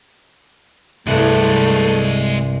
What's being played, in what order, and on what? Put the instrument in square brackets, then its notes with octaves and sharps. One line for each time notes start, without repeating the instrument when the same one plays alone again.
[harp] C2 G2 [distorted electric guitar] G#3 B4 [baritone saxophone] A3